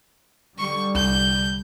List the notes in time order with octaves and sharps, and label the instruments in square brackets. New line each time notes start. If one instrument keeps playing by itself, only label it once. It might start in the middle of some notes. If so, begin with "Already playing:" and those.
[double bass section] D3 G3 [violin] C#6
[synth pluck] C2 [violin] G6